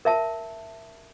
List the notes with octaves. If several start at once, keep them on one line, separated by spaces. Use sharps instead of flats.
A#4 E5 A5